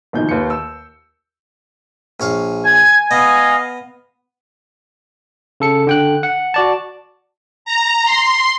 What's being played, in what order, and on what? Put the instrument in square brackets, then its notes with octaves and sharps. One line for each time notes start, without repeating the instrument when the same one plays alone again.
[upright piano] A#1 B2 D#3 D#4 G6
D#2 B4 C#7
E6
[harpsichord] A#1 C#5 F5
[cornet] G#5 [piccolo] G#6
[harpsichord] B3 [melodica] D#5 [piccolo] F5
[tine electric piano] C#3 A4 C#7
D3 G5 F#6
F#5
F#4 D5 A5
[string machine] A#5
C6